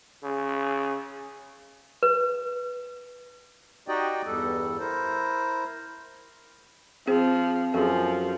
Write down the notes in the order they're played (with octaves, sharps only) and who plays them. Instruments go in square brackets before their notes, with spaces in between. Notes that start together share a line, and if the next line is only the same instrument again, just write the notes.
[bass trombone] C#3
[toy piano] B4
[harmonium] D#4 F#4 G4 D5 D#5 G5
E2 G2 G3 A4
E4 A#4 C5
[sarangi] F3 [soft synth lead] C4 [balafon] G#4 C5
[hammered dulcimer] F#2 [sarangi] F3 [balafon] G#4 A4